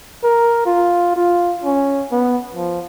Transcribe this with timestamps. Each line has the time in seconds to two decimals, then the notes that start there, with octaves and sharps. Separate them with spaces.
0.24 A#4
0.66 F4
1.16 F4
1.64 C#4
2.12 B3
2.55 F3